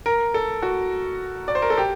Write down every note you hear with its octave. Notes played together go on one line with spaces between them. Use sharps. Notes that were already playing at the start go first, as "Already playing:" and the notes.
A#4
A4
F#4
D5
C5
A#4
A4
G4